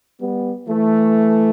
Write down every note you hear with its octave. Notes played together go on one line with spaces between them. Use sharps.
G3 B3
E3 A3